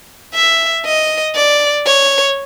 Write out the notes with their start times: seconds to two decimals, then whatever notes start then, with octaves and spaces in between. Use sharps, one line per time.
0.34 E5
0.86 D#5
1.35 D5
1.86 C#5